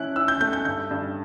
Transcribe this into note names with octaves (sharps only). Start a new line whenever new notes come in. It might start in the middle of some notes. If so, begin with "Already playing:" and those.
Already playing: C#4 E4 F#6
E4 E6
G6
A3 G6
G6
G2 G6
G2